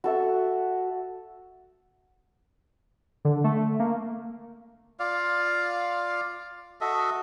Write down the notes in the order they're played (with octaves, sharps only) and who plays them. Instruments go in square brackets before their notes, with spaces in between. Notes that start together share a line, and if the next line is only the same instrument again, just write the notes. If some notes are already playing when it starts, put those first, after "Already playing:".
[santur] F#4 A4 E5
[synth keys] D3
A3
A#3
[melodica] F4 D5 F5
F#4 A4 D#5 E5